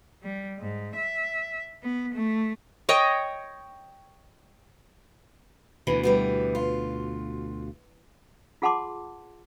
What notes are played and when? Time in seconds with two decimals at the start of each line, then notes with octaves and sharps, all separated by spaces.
0.23 G3
0.59 G#2
0.96 E5
1.83 B3
2.14 A3
2.89 C#5 D#5 G5 C#6
5.87 D2 B2 E3
6.03 E3 G3 B3
6.55 F4
8.62 F4 G#4 F#5 A5 C6 D6